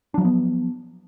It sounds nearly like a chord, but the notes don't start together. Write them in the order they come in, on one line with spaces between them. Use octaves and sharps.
D4 F#3 F3 B3